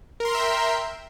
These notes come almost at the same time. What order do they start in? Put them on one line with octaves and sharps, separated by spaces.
A#4 C6 A#5 E5 G5